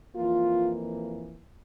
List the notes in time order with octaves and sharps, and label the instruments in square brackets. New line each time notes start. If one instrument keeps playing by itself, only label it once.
[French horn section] F2 E3 A#3 F4